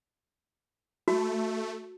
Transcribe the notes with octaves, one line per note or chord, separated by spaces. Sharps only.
A3 F#4